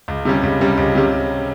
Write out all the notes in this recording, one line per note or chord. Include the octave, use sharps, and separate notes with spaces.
C#2
C3 G3 C#4
C#2
C3 G3 C#4
C#2
C3 G3 C#4